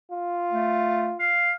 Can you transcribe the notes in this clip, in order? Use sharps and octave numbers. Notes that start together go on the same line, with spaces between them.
F4
A3
F5